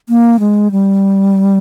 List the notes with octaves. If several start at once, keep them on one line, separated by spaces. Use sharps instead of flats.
A#3
G#3
G3